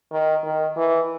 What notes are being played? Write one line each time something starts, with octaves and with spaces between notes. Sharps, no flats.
D#3
D#3
E3